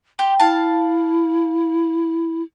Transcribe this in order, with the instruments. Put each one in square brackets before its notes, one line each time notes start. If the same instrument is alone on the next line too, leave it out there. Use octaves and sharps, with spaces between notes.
[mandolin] G4 [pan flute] C6
[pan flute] E4 [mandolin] F5 A5